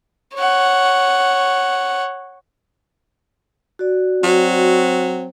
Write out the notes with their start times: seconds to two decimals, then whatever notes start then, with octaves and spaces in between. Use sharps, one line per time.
0.35 C#5 F#5
3.79 F#4 D5
4.24 F#3 C4